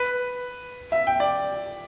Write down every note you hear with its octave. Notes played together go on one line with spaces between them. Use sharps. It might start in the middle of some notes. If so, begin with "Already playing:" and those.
Already playing: B4
E5
G5
D5